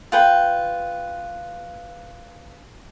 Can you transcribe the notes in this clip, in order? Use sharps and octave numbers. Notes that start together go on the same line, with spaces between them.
F4 B4 G5